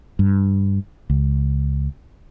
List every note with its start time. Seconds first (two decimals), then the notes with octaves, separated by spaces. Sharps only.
0.19 G2
1.10 C#2